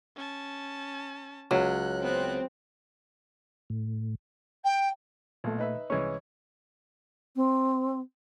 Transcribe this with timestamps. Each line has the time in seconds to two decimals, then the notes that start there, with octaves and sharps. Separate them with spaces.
0.16 C#4 A5
1.51 C#2 F#3 F#6
2.03 B3 C4 F#6
3.70 A2
4.64 G5
5.44 B1 A#2 A3
5.59 D#4 B4 E5
5.90 C2 E3 G#3 C#4 C#5
7.36 C4